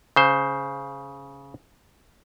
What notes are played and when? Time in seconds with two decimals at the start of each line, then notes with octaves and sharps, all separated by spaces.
0.16 C#3 C5